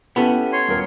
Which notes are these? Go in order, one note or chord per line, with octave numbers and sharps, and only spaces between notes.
B3 C#4 E4 G4 A4
C#5 C6
D#1 A#4